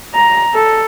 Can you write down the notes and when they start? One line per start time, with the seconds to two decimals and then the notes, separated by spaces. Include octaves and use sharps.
0.14 A#5
0.54 A4